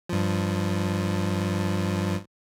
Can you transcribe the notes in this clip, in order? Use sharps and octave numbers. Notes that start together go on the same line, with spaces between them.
G2 F3